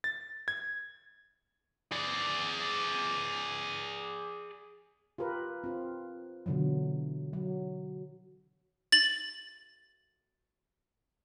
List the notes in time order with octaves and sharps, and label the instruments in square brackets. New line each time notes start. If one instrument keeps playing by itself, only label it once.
[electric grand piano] A6
G#6
[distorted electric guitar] G#4 D5
[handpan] F4 G4 A#4 B4
C4 F4
B2 D3 E3 F#3
F#3
[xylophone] A6 F#7